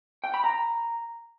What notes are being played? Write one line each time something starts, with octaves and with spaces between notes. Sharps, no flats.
G5
B5
A#5